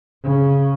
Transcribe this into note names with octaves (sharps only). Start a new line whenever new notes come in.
C#3